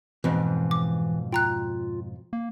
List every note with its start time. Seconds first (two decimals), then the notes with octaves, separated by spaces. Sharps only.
0.24 F2 G#2 B2 E3
0.71 D6
1.33 F4 G5 A#5 F#6
2.33 A#3